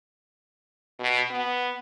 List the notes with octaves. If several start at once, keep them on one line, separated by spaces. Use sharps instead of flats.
B2
B3